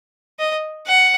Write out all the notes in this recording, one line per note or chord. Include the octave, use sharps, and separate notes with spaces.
D#5
F#5